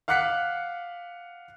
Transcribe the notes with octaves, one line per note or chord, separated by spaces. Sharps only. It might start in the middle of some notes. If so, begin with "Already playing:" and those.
F5 F#5 D6 F#6 B6 C#7